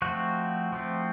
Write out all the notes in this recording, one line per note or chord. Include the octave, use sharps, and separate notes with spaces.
F3 A3 C4 F#4
F3 A3 C4